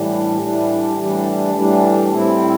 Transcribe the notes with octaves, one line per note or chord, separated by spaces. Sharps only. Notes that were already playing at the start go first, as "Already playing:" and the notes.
Already playing: A2 E3 G3 D4
A2 E3 G3 D4
A2 E3 G3 D4
A2 E3 G3 D4
A2 G3 C4 E4